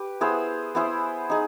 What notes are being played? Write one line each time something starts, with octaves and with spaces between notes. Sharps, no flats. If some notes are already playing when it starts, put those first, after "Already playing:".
Already playing: G4 B4
B3 E4 G#4 C5
B3 E4 G#4 C5
D#4 G#4